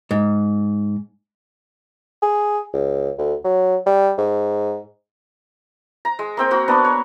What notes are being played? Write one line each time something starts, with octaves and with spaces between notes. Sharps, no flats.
G#2
G#4
C#2
D2
F#3
G3
G#2
A#5
G#3
A#3 C4 G5
A#3 F#4
A#3 B3 D4
C#5